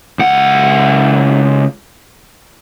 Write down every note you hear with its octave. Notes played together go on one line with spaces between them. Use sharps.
C#2 F#5